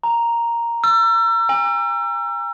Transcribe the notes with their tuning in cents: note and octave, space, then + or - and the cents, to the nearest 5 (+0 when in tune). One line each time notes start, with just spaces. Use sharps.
A#5 +0
E6 +35
G#5 -45